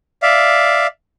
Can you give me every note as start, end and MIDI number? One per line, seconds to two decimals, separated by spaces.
0.23 0.87 74
0.23 0.87 76
0.23 0.87 77